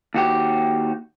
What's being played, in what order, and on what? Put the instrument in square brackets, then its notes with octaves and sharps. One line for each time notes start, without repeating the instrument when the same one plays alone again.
[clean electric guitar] D#2 F#4 G4